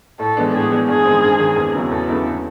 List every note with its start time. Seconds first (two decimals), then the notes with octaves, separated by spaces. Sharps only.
0.19 A2 A4
0.37 E3 G#3 B3 D4
0.54 A2 G#4
0.71 E3 G#3 B3 D4
0.88 G2 G#4
1.05 D#3 G#3 C4
1.23 G2
1.40 D#3 G#3 C4
1.57 E2
1.74 C#3 F#3 B3 E4
1.91 E2 A4
2.09 C#3 F#3 B3 E4